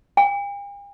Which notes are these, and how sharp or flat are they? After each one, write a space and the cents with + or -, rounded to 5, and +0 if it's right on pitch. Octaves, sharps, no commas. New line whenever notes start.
G5 +45